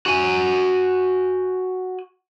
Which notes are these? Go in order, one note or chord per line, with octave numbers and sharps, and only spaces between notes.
F#4 G#5